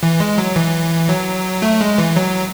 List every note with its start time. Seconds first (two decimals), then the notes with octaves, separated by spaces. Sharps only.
0.03 E3
0.20 G#3
0.38 F#3
0.56 E3
1.09 F#3
1.62 A3
1.81 G#3
1.98 E3
2.16 F#3